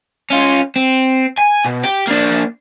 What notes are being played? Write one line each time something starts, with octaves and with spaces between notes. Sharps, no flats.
C#4 F4
C4
G#5
B2
G4
A#3 D4